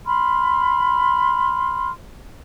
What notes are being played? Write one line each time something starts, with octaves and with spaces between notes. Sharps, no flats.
B5 C6 F6